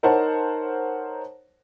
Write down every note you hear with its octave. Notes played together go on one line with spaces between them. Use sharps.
D#4 A#4 C5 C#5 F#5 A5